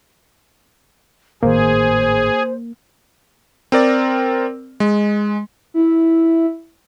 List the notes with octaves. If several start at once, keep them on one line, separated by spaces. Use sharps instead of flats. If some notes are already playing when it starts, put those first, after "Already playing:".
G#1 A2 D#3 A#3 G#4 C5
C4 A#4 D5
G#3
E4